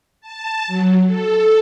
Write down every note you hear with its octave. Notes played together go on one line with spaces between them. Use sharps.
A5
F#3
A4